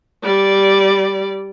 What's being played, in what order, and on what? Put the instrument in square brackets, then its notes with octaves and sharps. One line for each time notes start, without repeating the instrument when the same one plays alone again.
[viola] G3 D5